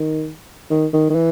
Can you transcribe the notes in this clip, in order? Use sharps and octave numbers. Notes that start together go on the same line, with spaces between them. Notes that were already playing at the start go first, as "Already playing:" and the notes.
Already playing: D#3
D#3
D#3
D#3
E3